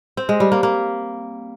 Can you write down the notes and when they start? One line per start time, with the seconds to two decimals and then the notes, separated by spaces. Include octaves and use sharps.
0.17 C4
0.29 G#3
0.40 G3
0.52 A#3
0.63 A#3